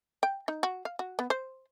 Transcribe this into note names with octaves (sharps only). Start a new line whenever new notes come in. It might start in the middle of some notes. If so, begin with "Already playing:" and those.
G5
D#4
F#4
F5
F#4
B3
C5